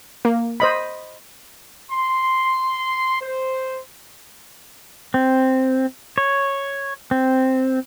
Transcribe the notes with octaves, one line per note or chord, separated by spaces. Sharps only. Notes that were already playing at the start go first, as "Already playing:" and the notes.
A#3
C5 D#5 B5
C6
C5
C4
C#5
C4